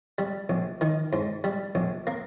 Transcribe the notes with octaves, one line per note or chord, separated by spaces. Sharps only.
G3
A#1
D#3
G#2
G3
A#1
A#3